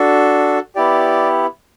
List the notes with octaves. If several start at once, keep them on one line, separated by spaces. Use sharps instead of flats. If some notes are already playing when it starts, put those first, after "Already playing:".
Already playing: D4 F#4 A4
B3 E4 G4 D5